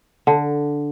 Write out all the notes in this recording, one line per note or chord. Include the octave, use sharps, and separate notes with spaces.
D3